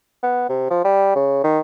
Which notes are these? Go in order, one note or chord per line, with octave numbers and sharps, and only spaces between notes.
B3
C3
F3
G3
C#3
D#3